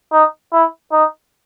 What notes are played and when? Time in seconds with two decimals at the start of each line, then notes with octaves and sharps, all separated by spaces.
0.12 D#4
0.52 E4
0.92 D#4